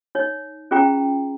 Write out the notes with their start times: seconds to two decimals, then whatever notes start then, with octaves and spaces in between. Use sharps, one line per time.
0.15 D#4 C#5
0.71 C#4 F4 G#4 G5 A#5